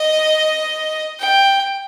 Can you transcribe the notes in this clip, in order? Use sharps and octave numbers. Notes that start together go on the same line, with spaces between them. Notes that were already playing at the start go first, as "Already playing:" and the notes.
Already playing: D#5
G5